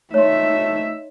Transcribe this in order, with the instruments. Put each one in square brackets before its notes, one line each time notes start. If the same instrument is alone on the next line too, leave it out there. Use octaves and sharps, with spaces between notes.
[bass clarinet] A3 [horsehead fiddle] D#4 E5 [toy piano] C#5 C6